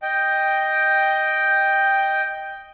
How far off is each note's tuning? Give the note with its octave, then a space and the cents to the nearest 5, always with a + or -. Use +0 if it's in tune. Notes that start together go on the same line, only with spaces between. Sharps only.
D#5 +0 G5 +0